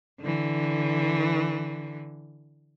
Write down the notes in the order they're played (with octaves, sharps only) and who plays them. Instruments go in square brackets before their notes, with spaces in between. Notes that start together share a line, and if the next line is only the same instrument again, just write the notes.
[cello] D3 E3